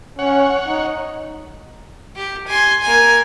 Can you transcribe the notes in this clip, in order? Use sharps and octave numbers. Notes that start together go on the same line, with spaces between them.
C#4 C#5 F#5
D#4
G4
G#5 C6
A#3 G#5